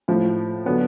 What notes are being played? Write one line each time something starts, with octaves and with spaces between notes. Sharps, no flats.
A2 F3
D3 F#3 B3